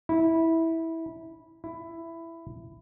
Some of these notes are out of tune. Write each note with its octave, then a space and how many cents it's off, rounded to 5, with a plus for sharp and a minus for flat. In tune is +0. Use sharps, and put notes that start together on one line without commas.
E4 -15
E4 +10